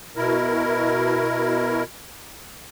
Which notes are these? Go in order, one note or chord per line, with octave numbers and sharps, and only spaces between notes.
B2 E4 A#4